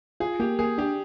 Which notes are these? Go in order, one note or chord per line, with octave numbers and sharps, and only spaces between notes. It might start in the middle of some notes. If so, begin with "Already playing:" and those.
F4 G#4
A#3 G4
A#3 G#4
D4 G4